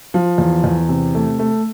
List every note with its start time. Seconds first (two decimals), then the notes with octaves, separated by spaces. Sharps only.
0.14 F3
0.38 E2
0.64 E2
0.89 C3
1.15 A3
1.39 A3